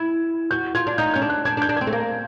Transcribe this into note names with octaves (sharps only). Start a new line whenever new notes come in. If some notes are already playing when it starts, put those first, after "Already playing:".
Already playing: E4 G#6
F#4 G6
F4 G#6
D4
D#4 G6
C#4 G6
D4
F#6
D4 G#6
D4
G6
D4
C4 G#6
A3
A#3